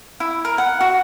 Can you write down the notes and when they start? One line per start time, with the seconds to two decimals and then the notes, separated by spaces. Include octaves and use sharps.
0.20 E4
0.45 A#4
0.58 F#5
0.81 F#4